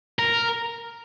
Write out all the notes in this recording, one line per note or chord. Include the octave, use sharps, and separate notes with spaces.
A#4